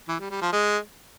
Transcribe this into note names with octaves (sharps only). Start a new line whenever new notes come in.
E3
G3
G3
F3
G#3